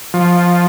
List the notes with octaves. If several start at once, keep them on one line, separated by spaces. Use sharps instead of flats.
F3